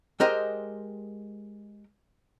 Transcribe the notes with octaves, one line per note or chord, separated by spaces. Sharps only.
G#3 G4 A#4 C5 D#5 G5